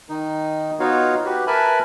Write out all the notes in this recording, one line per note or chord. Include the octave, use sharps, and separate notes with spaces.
D#3 D#4
B3 D#4 F4 F#4 C#5 F5
F#4 G4 B4
A#4 B4 E5 G#5 A5 B5